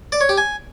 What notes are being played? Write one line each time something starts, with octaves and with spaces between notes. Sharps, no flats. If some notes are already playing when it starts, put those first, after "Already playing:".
D5
C#5
G4
G#5